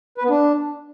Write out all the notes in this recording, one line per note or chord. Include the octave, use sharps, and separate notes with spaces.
B4
B3
D4